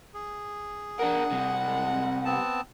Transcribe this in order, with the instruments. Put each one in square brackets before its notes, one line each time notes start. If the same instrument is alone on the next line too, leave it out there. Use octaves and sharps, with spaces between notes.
[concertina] G#4
[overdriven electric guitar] D4 A#4 [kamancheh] F#5
[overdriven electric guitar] C3 G3
[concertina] G#3
B3 C4 A5